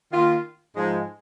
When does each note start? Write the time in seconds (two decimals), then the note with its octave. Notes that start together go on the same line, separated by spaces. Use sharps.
0.11 D#3 A#3 F4
0.75 G#2 F3 G#3